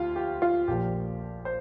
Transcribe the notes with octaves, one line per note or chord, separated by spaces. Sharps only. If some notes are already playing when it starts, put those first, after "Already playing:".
Already playing: D2 F4 G4
G4
F4
A#1 A#2 F3 G4
C5